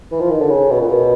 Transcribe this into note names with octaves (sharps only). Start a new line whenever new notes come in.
E3
F3
D#3
D3
C#3
B2
A#2
B2